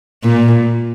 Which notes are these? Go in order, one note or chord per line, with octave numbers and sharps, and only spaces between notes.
A#2